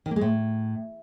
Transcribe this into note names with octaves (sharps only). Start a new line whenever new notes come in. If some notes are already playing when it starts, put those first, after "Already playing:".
D#3
A#3
G#3
A2